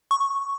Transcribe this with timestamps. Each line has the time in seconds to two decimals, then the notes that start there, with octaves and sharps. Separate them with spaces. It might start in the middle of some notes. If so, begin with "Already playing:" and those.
0.11 C#6